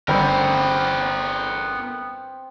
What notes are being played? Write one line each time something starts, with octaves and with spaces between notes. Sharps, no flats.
G1 B3 C4 A#4 B5 G6